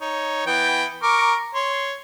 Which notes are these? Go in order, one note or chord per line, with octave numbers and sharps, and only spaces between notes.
D#4 C#5
E3 B3 G5
A#4 C#6 D6
C#5 C6